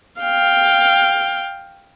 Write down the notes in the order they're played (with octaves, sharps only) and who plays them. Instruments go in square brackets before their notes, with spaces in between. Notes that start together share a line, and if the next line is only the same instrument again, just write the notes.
[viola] F5 G5